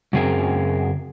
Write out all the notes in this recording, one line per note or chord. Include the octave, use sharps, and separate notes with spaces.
F#2 C#3 C4 G#4 A#4